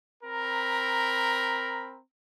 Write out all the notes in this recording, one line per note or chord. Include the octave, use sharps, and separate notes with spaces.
C4 A#4 A#5 B5